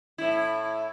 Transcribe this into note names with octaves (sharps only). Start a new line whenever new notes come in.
A2 E4